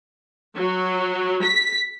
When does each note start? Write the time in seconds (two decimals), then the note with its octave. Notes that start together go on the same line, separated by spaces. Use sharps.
0.57 F#3
1.44 B6